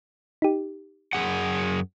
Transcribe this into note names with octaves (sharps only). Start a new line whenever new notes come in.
D#4 G4
F#2 G#4 F#5